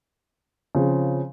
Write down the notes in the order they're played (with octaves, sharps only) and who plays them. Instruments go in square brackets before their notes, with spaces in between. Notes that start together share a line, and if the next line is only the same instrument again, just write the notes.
[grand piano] C#3 F3 C4